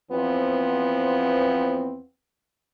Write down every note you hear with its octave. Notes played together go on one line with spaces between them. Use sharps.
E2 F3 B3 C4